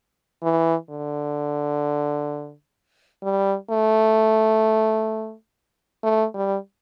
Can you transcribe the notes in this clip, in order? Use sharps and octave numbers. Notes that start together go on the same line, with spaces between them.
E3
D3
G3
A3
A3
G3